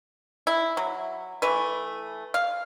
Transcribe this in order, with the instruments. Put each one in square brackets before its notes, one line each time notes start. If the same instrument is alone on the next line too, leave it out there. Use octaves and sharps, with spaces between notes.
[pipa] E4
F#3
E3 A3 B4
F5